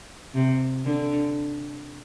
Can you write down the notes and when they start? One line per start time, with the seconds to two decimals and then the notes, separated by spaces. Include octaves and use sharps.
0.34 C3
0.85 D3